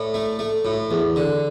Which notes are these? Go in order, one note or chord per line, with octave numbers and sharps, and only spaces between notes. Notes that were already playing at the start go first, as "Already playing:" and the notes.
Already playing: A2 A4 D5
A3
A3
A2
E2
D3